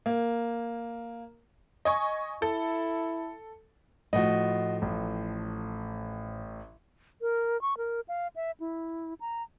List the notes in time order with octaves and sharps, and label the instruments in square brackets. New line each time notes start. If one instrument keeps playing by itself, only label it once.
[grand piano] A#3
[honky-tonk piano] D#5 G#5 C#6
[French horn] E4 [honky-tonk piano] A4
[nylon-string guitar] A2 F3 [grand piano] F#4 D#5
[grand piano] A1
[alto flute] A#4
C#6
A#4
F5
E5
E4
A#5